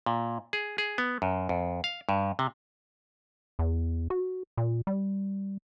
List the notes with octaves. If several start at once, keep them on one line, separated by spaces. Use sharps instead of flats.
A#2
G#4
G#4
B3
F#2
F2
F5
G2
C3
E2
F#4
A#2
G3